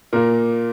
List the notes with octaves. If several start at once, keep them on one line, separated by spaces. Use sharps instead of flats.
A#2 A#3 A#4